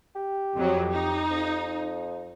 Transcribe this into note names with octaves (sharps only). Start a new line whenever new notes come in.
G4
F2 F#3
D#4
F2